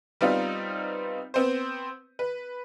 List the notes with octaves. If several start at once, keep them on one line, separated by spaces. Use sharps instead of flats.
G3 B3 C4 D#4 F4
B3 C4 C5
B4